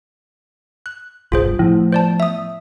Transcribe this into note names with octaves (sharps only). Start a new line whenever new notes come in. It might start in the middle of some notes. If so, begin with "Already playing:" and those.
F#6
F#1 B1 G2 F4 G#4 C5
A2 F3 B3
C5 D5 A5
E5 D#6